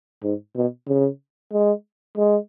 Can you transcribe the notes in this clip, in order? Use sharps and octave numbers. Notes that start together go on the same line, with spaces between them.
G#2
B2
C#3
G#3
G#3